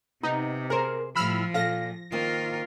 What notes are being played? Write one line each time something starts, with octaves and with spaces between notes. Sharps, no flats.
C3 B3 D#4
G#4 A#4 C5
A2 F3 G3 B5 E6 F6
A#2 A4 F5 A#6
D#3 A#3 C4 F4 A#4